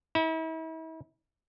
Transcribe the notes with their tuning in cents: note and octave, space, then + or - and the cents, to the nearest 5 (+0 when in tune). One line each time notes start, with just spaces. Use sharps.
E4 -40